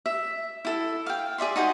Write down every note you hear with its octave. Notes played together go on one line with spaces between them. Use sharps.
E5
E4 A4
F5 G5
G#4 D5 E5 C6
D#4 F#4 G#4 C5